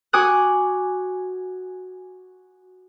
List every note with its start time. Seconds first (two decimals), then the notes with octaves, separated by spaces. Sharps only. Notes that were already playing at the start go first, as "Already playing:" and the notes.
0.13 F#4 G#5 D6 D#6 F#6